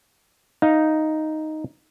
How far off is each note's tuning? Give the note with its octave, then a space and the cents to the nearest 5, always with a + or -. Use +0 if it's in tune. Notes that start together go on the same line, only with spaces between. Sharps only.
D#4 +0 F5 +0